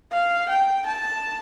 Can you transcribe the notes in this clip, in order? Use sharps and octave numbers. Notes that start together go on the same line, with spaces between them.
F5
G5
A5